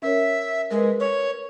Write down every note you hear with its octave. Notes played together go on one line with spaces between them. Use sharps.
C#4 A#4 C#5 E5
G#3 A#4 B4
C#5